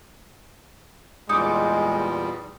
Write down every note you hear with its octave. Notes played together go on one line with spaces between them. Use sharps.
E2 A#2 G3 G#3 D#4 D6